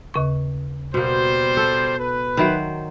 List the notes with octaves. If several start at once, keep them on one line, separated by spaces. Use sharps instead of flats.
D#2 C#3 C#6
B2 G3 A#3 C5
A4
B4
D#3 F#3 C5 E5 B5